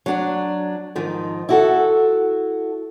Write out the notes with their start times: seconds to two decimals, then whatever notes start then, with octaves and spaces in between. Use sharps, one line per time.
0.06 F#3 D4
0.95 G#2 D#3 F3 D#4
1.49 E4 F#4 A4